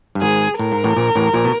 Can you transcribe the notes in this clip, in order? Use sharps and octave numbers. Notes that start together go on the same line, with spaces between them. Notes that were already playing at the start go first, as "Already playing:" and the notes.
G2
G#1 G#2 G#4
A2 A#4
G#2
A1 A2
A#1 A#2
A1 A2
A#1 A#2
B2